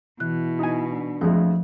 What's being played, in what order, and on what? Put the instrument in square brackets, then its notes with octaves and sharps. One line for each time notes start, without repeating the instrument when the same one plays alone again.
[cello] B2 [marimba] E3 F#6 [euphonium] E4
[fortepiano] D#4 G#5
[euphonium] D4
[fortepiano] F2 G#3 A3 [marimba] F3